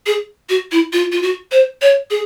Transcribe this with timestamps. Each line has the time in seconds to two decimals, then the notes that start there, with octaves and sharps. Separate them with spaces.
0.06 G#4
0.49 F#4
0.72 E4
0.93 F4
1.12 F4
1.22 F#4
1.52 C5
1.82 C#5
2.10 G#4